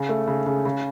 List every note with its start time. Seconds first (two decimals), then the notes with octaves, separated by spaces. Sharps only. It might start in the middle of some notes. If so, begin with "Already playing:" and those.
Already playing: C#3
0.09 A3
0.27 C#3
0.46 C#3
0.65 C#3